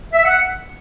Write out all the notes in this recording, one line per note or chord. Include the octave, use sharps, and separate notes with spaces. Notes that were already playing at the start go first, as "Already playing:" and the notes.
E5
F#5